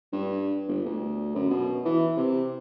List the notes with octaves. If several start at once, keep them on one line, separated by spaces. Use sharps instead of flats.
G2
G1
D2
F#2
B2
E3
C3